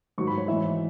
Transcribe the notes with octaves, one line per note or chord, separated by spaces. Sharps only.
G#2 D#3 F#3 C#6
B5
C#5
G#2 E3 E5